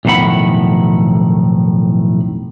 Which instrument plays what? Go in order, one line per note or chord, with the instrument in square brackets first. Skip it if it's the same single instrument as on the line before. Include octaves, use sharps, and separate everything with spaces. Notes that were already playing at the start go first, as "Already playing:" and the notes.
[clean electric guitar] B1 F2 A2 D#3 F#5 B5